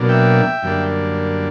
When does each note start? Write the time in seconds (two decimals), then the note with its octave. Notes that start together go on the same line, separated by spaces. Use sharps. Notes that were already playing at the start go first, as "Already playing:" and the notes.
Already playing: B2 F#3 A#3 D4
0.09 E5 G5
0.63 F#2 D3 G3 A#3 D4